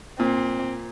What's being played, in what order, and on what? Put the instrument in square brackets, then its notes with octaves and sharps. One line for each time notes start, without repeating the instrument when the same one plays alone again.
[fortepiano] A#2 [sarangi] C4